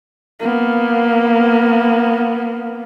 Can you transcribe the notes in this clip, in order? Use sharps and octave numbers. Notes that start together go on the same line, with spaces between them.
A#3 B3